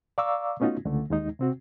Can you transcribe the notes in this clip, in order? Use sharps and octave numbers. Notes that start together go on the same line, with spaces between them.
D5 F5 A#5 C#6 D6 E6
A3 B3 C#4 D#4 F4 F#4
C#2 D3 A3
D#2 G#3 D#4
C3 C4 F#4